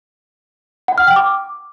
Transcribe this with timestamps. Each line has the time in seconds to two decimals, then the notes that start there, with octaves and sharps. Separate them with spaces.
0.88 F#5
0.98 F6
1.07 G5
1.16 D6